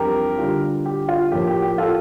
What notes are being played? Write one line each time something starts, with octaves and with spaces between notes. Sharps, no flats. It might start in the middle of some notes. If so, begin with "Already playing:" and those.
Already playing: F2 E3 G3 D4 G4 A#4
D3 G3 D4 F4
G4
F4
A2 F3 A#3 G4
G4
G4
F4 A4